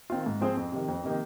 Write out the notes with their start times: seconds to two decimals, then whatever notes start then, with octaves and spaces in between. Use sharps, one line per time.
0.10 D#3 C4 F4
0.26 G#2
0.41 F3 C4 G#4 C5
0.57 F2
0.72 C3 D#3
0.88 F2
1.04 C3 D#3 A#3 D#4